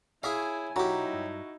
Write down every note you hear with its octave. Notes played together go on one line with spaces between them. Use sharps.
E4 G#4 C#5 E5 F5 G#5
B1 F#3 D#4 E4 F#4 G4 A#5
G2